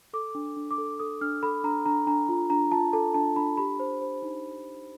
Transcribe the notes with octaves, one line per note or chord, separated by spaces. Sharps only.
A4 D6
D4
D4
D6
A4
A4 D#6
D4 F6
A4 B5
D4 A#5
D4 A#5
D4 A#5
F4
D4 A#5
F4 A5
A4 A5
D4 A5
D4 B5
G4 B5
C5
C5
D#4